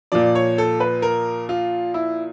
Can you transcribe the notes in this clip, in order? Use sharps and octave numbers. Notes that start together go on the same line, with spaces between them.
A#2 F3 D5
C#5
A4
B4
A#4
F4
E4